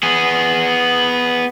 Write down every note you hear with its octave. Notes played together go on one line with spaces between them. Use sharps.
B3 G#4